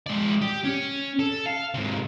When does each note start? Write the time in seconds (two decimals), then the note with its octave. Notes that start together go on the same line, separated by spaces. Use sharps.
0.06 G#3 D5
0.41 G4
0.64 C#4
1.19 A4
1.46 F5
1.74 G#2 C3